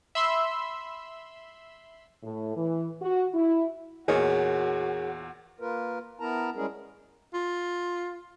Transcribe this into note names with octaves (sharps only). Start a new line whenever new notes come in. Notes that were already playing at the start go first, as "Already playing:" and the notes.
E5 B5 C6 E6
A2
E3
F#4
E4
E2 A#2 F#4 G#4 A#4 C#5 D#5
A#3 F4 A#4 B4
B3 E4 A#4 A5 A#5
G3 G#3 C#4 E4 G#4 A#4
F4